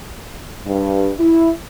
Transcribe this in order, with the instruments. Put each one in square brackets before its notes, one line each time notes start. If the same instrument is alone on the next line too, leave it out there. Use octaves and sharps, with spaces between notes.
[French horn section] G2
E4